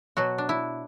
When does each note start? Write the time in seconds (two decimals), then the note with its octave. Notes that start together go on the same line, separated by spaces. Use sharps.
0.17 B2 F#3 F#4
0.38 D4
0.49 E4